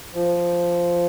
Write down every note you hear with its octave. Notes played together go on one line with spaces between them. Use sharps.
F3